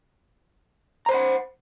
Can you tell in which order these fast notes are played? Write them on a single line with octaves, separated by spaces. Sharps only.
A#5 C5 B5 F#5